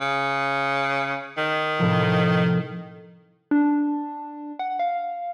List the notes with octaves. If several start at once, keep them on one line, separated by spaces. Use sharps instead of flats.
C#3
D#3
A2 C3 F3
D4
F#5
F5